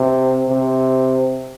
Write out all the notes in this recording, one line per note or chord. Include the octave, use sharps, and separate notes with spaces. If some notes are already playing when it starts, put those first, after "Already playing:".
Already playing: C3
C3